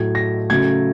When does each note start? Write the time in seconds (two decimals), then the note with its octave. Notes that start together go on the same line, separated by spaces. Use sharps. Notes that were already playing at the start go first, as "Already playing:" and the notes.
Already playing: A2 F#3 A3 G#6
0.15 A#6
0.50 C#3 F#3 A3 G#6